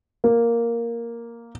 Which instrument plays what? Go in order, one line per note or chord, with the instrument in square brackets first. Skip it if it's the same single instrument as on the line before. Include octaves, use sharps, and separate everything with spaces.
[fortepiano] A#3